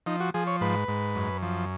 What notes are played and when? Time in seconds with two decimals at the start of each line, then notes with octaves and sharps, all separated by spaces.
0.06 F3 D#4
0.20 F#4
0.34 F3 G#4
0.47 C#5
0.61 G#2 B4
0.88 G#2
1.16 F#2
1.42 F3